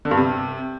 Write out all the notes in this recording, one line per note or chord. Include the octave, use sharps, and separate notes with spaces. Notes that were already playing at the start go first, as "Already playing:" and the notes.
D3
G2
C3